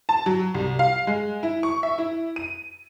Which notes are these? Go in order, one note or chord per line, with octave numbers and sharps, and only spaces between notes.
A5
F#3
C2
F5
G#3
E4
C#6
E5
E4
D#7